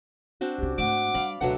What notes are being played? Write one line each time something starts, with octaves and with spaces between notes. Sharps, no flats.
C4 D4 F#4
C2 C#4 G4
G#2 A3 E5 F#5 D6
G3 D4 D5 F5 B5
C#2 B2 F#3 A3 D4 B4 F#5